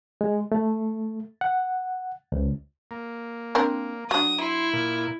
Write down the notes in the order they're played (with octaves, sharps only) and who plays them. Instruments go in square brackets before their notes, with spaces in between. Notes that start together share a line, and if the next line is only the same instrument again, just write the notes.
[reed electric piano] G#3
A3
F#5
C#2
[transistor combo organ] A#3
[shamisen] C4 D4 A#4
[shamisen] F#3 D4 [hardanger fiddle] D#6
[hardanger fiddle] E4 [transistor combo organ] C6
[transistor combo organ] A#2